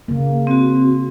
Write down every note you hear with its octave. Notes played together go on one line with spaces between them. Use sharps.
C#3 A#3
C4 F#4